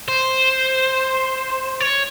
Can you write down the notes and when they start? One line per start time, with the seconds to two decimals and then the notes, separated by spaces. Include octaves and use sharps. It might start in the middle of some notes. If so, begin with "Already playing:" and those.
0.08 C5
1.80 C#5